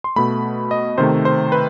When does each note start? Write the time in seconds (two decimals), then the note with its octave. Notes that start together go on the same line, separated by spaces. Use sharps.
0.04 C6
0.16 B2 A3 B5
0.71 D#5
0.98 C3 D#3 A3 C5
1.25 C5
1.52 B4